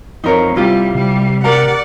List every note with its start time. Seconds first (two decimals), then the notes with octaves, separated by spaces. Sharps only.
0.24 F2 D#4 A#4 C#5
0.56 C3 G3 E4 F4 G4
0.95 C3 G3
1.44 G4 A#4 D5 F#5 A#5